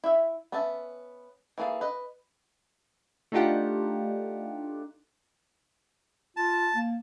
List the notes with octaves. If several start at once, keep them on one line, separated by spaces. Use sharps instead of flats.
E4 E5
B3 C#4 B4 E5 A5
E3 A#3 G#4 A4 F5
B4 D#5
A3 D4 D#4 F4 G4 F#5
F4 A5
A#3